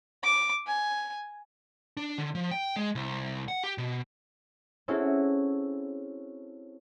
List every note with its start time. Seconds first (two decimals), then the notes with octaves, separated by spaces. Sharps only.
0.24 D6
0.67 G#5
1.97 D4
2.18 D3
2.35 F3
2.51 G5
2.76 G#3
2.95 C2
3.48 F#5
3.64 G4
3.78 B2
4.88 C4 C#4 E4 F#4 G#4 A4